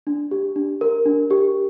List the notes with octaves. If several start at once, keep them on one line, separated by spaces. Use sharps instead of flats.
D4
G4
D4
A#4
D4
G4